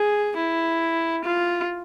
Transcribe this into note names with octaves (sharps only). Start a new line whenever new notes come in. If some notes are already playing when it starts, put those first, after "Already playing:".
Already playing: G#4
E4
F4